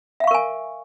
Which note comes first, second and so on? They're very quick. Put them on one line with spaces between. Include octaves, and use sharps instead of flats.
E5 F5 C#6 A#4 G#5